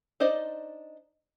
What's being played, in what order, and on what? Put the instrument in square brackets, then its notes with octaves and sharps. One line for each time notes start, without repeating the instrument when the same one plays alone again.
[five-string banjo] D4 D#4 C5 D5 D#5